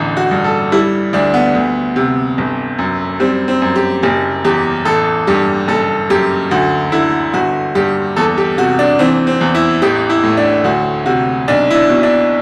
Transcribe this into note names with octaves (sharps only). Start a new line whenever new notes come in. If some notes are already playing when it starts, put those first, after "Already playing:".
Already playing: A1 E2 D3
F#4
G2
A4
G3 E4
D2 D4
B3
D2
C3
G1
F#2
G3 C4
C4
F#2
G4
F#1 G4
E2 G4
A1 A4
G2 G4
F#1 A4
F#2 G4
D2 F#4
D3 E4
G1 F#4
G2 G4
E2 A4
G4
C3 F#4
D4
E3 C4
C4
E2
E4
A1 G4
E4
A2
D4
D2 F#4
C3 F#4
B1 D4
E4
D4
B2
D4